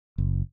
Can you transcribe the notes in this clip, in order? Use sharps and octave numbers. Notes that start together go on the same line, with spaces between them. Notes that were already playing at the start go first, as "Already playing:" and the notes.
F#1